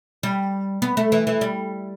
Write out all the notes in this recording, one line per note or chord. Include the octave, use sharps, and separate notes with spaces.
G3
B3
A3
E3
E3
G3